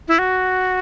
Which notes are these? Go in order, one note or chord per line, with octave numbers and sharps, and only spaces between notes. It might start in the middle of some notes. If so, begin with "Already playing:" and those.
E4
F#4